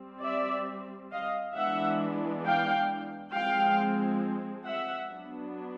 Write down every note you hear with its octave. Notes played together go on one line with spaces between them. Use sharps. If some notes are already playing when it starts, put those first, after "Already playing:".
Already playing: G3 C4
D5 E5
D#5 F5
E3 G#3 B3 D4 E5 F#5
F5 G5
F3 G#3 C4 F5 G5
E5 F#5
F#3 B3 D4